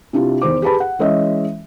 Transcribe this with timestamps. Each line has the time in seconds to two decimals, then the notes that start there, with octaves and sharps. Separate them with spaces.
0.13 C3 D4 E4 F4 G4
0.42 E2 D#3 C5 D6
0.62 G4 G#4 B4 A5 B5
0.80 F#5
0.99 E3 G#3 C#4 C#5 D#5 E5